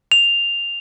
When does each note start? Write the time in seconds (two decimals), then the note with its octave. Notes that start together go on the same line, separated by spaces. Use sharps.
0.12 F7